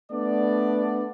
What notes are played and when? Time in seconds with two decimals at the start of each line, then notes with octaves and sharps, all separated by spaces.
0.11 A3 B3 D4 D5